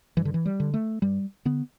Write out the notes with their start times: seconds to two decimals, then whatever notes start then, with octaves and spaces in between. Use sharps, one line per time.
0.17 G2 E3
0.25 D3
0.34 E3
0.46 G3
0.60 D3
0.74 A3
1.02 G2 G3
1.45 D3 B3